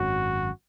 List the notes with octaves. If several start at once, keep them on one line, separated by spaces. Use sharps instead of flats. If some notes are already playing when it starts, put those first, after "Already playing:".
Already playing: G#1 F#2 F#3 F#4